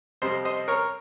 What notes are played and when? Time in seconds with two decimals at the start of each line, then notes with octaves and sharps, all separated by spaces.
0.22 F2 C3 G3 C5 D#5
0.45 C5 D#5
0.68 A#4 C#5